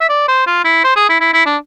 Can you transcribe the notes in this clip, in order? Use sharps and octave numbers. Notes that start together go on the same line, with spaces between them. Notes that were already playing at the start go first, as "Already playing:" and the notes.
E5
D5
C5
F4
E4
C5
G#4
E4
E4
E4
D4